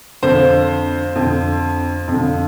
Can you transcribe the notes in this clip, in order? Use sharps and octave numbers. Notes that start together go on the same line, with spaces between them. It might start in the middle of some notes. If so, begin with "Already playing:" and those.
F2 D3 C5
F2 D3
F2 D3